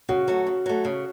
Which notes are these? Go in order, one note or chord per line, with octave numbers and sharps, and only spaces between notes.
C#3 F#4
F#3 A3
C#3
F#3 A3
C#3